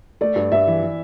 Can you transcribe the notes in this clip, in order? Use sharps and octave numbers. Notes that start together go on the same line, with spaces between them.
A3 D5
G2
G2 E5
E3
E3